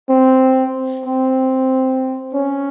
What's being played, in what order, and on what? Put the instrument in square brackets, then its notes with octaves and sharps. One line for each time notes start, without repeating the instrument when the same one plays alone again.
[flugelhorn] C4
C4
C#4